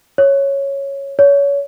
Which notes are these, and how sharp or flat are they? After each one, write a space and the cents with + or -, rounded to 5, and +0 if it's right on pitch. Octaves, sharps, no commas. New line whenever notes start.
C#5 -5
C#5 +25